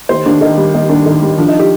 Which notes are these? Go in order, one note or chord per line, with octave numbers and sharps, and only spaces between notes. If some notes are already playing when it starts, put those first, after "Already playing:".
D#2 C5
D#2 D4
D#3 D#4
G3
D#2 D#4
D#2 D4
D#3 D#4
G3
F3 D4
D#4
G4